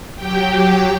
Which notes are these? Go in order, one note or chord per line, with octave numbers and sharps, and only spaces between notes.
F#3 G4 G5